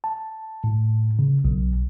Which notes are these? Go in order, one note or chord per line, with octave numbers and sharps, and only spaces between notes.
A5
A2
C#3
B1